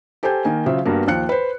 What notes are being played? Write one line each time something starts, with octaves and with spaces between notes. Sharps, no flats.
G4 A4 C5 G#5 G6
D#3 A#3 G#5
C#3 F#3 F4 C5 E5
G2 A#3 B3 F#4 A#4
D#2 F3 F5 F#6 C#7
B4 C5